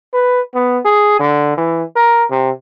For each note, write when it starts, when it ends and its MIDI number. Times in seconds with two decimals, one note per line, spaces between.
0.14 0.41 71
0.55 0.78 59
0.85 1.16 68
1.20 1.56 50
1.57 1.84 52
1.96 2.24 70
2.30 2.51 48